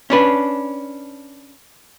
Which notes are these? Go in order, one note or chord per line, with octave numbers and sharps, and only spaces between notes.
C#4 D4 B4